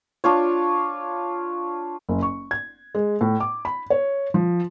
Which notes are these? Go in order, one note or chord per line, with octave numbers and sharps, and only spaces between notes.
D4 F4 C#5
F#1
C#6
G#6
G#3
A2
D6
B5
C#5
F3